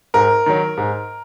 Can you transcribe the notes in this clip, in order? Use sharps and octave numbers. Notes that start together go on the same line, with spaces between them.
G#2 A#4
D#3 F#3
G#2